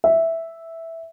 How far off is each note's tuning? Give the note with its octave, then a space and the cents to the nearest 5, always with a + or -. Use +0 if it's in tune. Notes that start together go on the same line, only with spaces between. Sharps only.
E5 -5